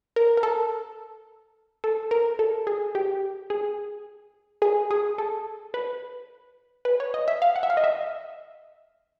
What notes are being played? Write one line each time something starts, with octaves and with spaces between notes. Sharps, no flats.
A#4
A#4
A4
A4
A#4
A4
G#4
G4
G#4
G#4
G#4
A4
B4
B4
C#5
D#5
E5
F5
F#5
E5
F5
D#5
E5